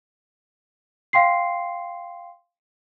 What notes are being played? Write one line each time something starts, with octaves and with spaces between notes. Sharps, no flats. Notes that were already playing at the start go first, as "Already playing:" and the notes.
F5 G5 C6 C7